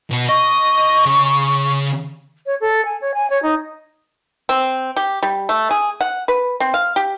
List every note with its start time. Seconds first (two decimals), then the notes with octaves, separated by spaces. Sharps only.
0.11 B2 B4
0.29 D#5 C#6
1.06 C#3
2.46 C#5
2.61 A4
2.85 G#5
3.01 C#5
3.14 G#5
3.30 C#5
3.43 D#4
4.49 C4
4.97 G4
5.23 G3
5.49 A3
5.71 G#4
6.01 F#5
6.28 B4
6.60 C4
6.74 F5
6.96 G4